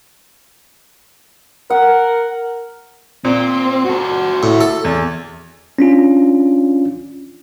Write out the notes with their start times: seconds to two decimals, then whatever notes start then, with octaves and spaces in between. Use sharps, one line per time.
1.70 A#4 F#5
3.25 A#2 C4
3.85 F#4 A4
4.43 A2
4.61 A4
4.84 E2
5.79 C#4 D4 F4